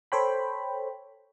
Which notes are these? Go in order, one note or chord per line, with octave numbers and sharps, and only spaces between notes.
A4 C5 C#5 G5 B5